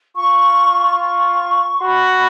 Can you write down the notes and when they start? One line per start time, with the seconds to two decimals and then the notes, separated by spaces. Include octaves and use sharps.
0.17 F4 C#6
1.00 C#6
1.78 C6
1.83 F#4 B5